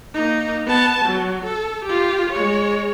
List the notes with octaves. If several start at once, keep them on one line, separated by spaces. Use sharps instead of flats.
A#3 D#4
B3 A5
F#3
A4
F4 G4
G#3 C#5